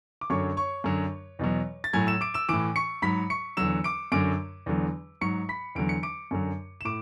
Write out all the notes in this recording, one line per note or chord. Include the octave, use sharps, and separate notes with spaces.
D6
F#2 D3 F#3 C#5 C#6
C#5 C#6
F#2 D3 F#3
E2 B2 F#3
A6
A2 F#3 G#5 G#6
E6 E7
D6 D7
E6 E7
A2 E3 D6 D7
C#6 C#7
G#2 F#3 B5 B6
C#6 C#7
E2 D3 F#3 E6 E7
D6 D7
F#2 D3 F#3 D6 D7
E2 D3 F#3
G#2 F#3 C#6 C#7
B5 B6
E2 D3 F#3 D7
C#7
D6 D7
F#2 D3 F#3
E7
A2 D6 D7